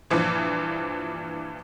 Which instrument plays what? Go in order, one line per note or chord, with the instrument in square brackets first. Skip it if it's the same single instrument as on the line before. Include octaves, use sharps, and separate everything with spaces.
[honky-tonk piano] G2 A#2 E3 F3